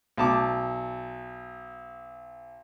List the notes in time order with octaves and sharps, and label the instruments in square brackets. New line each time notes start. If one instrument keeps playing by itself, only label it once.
[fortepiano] B1 A5 D6